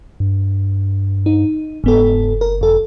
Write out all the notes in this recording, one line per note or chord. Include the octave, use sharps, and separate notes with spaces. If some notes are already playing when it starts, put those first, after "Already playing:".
G2
D#4
F#1 G#2 B3 A4
A#4
F2 A4